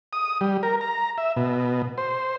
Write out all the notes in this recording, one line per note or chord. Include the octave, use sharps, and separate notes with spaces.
D#6
G3
A#4
A#5
E5
B2
C5